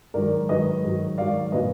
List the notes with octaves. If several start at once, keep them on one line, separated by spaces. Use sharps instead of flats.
G#2 D#3 F#3 A#4 D5
G#2 D#3 F#3 B4 D#5
G#2 D#3 F#3
G#2 D#3 F#3 D5 F5
A#2 F#3 B4 D#5